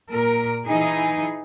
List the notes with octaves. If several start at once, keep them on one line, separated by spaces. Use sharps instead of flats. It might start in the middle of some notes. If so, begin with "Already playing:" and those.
A#2 A#4
E3 D#4 G#4